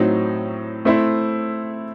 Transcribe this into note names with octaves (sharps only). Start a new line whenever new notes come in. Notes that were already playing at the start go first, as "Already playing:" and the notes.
Already playing: A2 F#3 C4 D#4
A3 C4 E4 C5